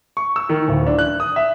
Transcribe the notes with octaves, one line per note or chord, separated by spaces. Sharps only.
C#6
E6
D#3
D1
D4
F#6
D#6
E5